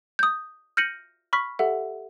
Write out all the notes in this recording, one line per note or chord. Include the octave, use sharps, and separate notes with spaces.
D#6 G6
F6 G6 A#6 C#7 D#7 F#7
B5 C#6 F6 B6
G4 A4 E5 F#5